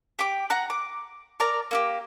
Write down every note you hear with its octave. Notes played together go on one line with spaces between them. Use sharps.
G4 G5 D6
F#5 A#5 F#6
D6
A#4 D5 A#5
A#3 E4 G4